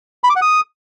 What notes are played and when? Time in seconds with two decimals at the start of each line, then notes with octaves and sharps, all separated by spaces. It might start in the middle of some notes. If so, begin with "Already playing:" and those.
0.24 B5
0.30 D6
0.36 F#5
0.42 D#6